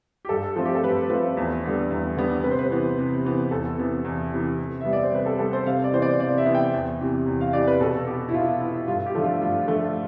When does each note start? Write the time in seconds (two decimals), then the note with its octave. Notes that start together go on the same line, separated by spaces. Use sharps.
0.25 G4
0.29 G2 A4
0.56 F3 A3 C4
0.65 G4
0.75 A4
0.84 G2 B4
1.09 F3 A3 C4 B4
1.37 E2
1.63 D3 G3 B3
1.91 E2
2.17 D3 G3 B3
2.44 C3 B4
2.51 C5
2.59 B4
2.71 E3 B3
2.98 C3
3.25 E3 B3
3.51 E2 A4
3.78 C3 E3 B3
4.04 E2
4.32 C3 E3 B3
4.59 C3
4.81 G3 B3 E5
4.93 D5
5.03 C5
5.12 C3 B4
5.26 A4
5.39 G3 B3 A4
5.53 C5
5.66 C3 F5
5.84 D5
5.92 E3 B3 C5
6.02 D5
6.19 C3 D5
6.38 E5
6.46 E3 B3
6.55 G5
6.74 E2
7.00 C3 E3
7.26 E2
7.41 F5
7.53 C3 E3 D5
7.67 B4
7.80 B2 A4
8.07 B3 G4
8.29 E4
8.33 B2 F4
8.60 B3 E4
8.88 G2 F4
9.06 G4
9.15 D3 F3 A3
9.24 F4
9.41 G2 F4
9.68 D3 F3 A3